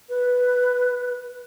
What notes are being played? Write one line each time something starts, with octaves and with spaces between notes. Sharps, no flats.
B4